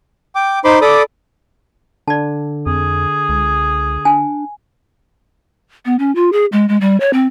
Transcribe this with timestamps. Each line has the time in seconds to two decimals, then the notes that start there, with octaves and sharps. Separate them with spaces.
0.35 G5 D6
0.65 D#4 C5 B5 C6 D6
0.82 A4 D5 B5 D6 D#6
2.08 D3 D5 A5
2.66 F2 G#4
3.29 C#2
4.05 D4 G#5
5.85 B3
5.99 C#4
6.15 F4
6.32 G#4
6.52 G#3
6.69 G#3
6.81 G3
7.00 C#5
7.13 C4